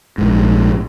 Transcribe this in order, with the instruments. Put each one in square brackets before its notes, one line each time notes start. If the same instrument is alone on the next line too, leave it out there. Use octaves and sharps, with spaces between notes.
[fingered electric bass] A#1 G#2